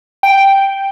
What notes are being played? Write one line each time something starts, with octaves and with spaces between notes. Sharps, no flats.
G5